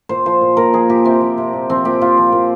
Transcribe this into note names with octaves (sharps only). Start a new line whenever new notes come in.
A#2 C5
F3 C5
A#2
A#2 A#4
F3 G#4
A#2 G4
C3 C4
F3
C3
A#2
F3 C4
A#2 G4
A#2 F4
F3
A#2